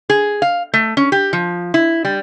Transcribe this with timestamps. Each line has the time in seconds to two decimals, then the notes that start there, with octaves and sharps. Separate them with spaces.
0.10 G#4
0.42 F5
0.74 A3
0.97 C#4
1.12 G4
1.33 F3
1.74 E4
2.05 G3